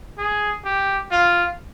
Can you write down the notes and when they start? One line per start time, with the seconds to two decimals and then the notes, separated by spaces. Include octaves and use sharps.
0.18 G#4
0.65 G4
1.11 F4